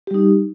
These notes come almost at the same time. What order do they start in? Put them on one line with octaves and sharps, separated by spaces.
G4 G3 D#4